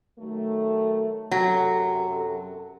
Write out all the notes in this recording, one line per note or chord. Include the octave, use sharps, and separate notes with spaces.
D#3 F#3 A3
F#2 C3 F#3 A4